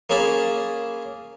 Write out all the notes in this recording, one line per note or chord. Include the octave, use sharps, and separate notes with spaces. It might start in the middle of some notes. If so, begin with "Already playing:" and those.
A#3 C#4 G#4 A5 B5